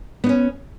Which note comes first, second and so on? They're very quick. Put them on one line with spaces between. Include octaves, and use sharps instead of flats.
B3 D#4 C#4